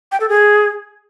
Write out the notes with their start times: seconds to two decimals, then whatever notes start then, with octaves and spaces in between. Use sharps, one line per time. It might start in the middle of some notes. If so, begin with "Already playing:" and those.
0.12 G5
0.20 A4
0.29 G#4